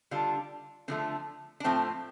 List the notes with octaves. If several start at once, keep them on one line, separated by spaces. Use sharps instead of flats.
D3 G3 D4 F4
D3 F3 A3 C4
D4
A2 F3 A3 C4